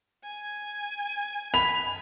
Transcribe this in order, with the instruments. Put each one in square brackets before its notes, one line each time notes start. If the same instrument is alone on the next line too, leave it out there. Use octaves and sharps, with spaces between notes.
[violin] G#5
[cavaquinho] B5 [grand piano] F7